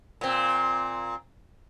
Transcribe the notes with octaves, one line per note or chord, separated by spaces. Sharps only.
A#2 C4